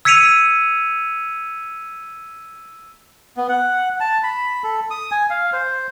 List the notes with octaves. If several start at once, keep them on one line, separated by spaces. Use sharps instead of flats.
E6 G#6 B6 C#7 D#7 F7
B3
F#5
A5
B5
A4
D#6
G#5
F5
C5